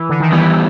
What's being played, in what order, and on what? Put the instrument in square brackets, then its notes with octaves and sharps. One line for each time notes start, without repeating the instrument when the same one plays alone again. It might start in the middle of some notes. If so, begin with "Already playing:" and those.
Already playing: [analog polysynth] E3
D3
D#3
[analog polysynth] E3 [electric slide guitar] G3 B3 E4 G4